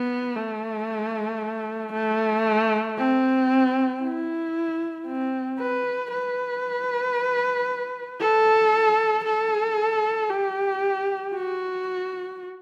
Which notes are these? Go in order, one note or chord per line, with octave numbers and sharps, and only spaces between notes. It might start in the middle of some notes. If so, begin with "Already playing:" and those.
Already playing: B3
A3
A3
C4
E4
C4
B4
B4
A4
A4
G4
F#4